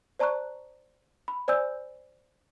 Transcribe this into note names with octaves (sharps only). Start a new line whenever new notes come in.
C5 D5 A5 A#5 C#6 F#6
B5
C5 D5 G#5 E6 G6